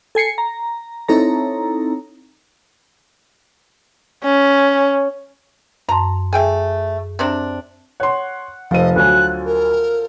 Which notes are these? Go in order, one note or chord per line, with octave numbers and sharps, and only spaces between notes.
A4 G#5 C7 C#7
A#5
C4 D#4 E4 A4 C#5 A#5
C#4
F#2 A5 A#5 C6
A3 G#4 G5 G#5
C3 C4 D4
C#5 F#5 C6
F1 F3 A4 D#5 D#7
D2 F#3 G#5 F#6
A#4